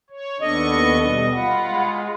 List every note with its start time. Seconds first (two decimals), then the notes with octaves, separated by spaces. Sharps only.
0.10 C#5
0.41 D#2 B3 D4 A4 D#5 C#6
1.02 B2 G3
1.34 F4 F#5 B5
1.69 G#3